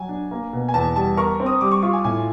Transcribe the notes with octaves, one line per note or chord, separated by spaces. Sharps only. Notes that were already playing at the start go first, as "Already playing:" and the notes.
Already playing: F#3 G#5
D4
A#3
B2
G#5
E2 A5
G3 A5
A#4 C#6
C4
D#6
G3 D6
C#6
F4 C#6
G#5
A2 G#5